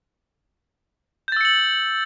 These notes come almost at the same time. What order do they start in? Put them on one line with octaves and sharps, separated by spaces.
G6 A6 E6 C#7 F#7